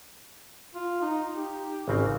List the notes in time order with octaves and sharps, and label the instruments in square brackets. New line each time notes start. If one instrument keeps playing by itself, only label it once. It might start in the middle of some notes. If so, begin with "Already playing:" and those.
[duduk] F4
D#4
G4
[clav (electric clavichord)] G#1 C#3 C4